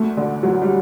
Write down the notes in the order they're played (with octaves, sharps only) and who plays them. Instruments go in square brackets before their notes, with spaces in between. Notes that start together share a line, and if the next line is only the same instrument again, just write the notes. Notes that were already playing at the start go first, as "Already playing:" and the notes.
Already playing: [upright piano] D2 A3
D3
D2 F#3
G3